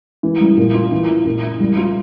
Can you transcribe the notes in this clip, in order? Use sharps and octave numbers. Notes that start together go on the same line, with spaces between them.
E3
G3
A#2
F4
E3
E4
A#2
E4
G3
F4